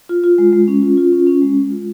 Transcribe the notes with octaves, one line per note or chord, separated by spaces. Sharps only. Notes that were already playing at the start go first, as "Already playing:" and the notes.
F4
F4
G#3
G#3
C#4
F4
F4
C#4
C#4
G#3
G#3
F4